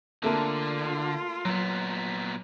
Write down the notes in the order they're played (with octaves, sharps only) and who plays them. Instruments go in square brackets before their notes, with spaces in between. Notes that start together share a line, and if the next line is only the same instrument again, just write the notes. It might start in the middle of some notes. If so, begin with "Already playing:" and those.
[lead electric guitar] D3 [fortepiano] A3 A#3 [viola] F4
[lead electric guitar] A#2 B3 [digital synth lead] F#3